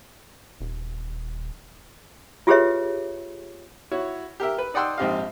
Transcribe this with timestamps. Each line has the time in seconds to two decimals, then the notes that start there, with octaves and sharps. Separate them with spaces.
0.61 D#1
2.47 F4 G4 G#4 B4 C#5 E5
3.91 E4 F#4 C#5
4.40 G4 A#4 E5
4.58 B4
4.74 D#4 D5 F#5 G5 C6 E6
4.97 A#1 G#2 C4 G4 D#5 F5